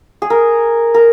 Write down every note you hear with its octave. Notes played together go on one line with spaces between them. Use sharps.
G#4
A#4
A#4